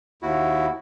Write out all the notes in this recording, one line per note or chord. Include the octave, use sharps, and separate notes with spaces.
D#2 E4 F#4